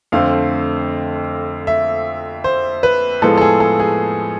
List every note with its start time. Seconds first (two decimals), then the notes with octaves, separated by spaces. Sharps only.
0.12 F2 D3 A3 C4 F5
1.67 E5
2.44 C5
2.83 B4
3.22 A2 F3 G#3 B3 A4
3.38 A4
3.41 G#4
3.60 A4
3.80 G#4